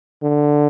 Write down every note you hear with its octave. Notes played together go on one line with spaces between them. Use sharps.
D3